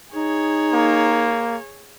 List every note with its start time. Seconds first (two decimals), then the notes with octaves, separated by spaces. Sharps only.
0.14 D#4 G#4 C#5
0.73 A#3